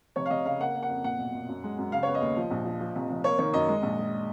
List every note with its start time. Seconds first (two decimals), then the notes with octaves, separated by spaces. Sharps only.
0.16 F1 C#5
0.26 F5
0.30 F1 D#5
0.45 C#3 F5
0.60 A#3 F#5
0.75 A#3
0.83 F#5
0.89 F2
1.04 A#2 F#5
1.19 B1
1.34 A#2
1.49 F#2
1.64 G#3
1.78 F#2
1.92 C#3 F5
2.03 B3 C#5
2.15 D#5
2.21 D#2
2.37 F3
2.51 A#1
2.65 F3
2.80 F3
2.96 F1
3.10 F1
3.24 A#3 C#5
3.39 D#3 C#5
3.54 F#2 D#5
3.69 G#3
3.83 A#1
3.98 G#3